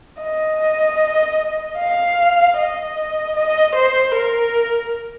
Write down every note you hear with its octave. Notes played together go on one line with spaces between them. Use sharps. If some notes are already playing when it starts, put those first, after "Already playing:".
D#5
F5
D#5
D#5
C5
A#4